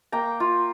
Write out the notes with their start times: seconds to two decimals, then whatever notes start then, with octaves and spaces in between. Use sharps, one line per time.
0.12 A#3 G5 A#5
0.40 F4